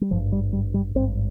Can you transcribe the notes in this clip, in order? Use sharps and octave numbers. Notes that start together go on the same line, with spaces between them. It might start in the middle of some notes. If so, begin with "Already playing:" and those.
G3
G#1 G2 F3
G3
G3
G3
G#1 G2 C4